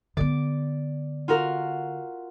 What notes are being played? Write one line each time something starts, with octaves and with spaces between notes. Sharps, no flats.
D3 B3 D5
F4 F#4 A#4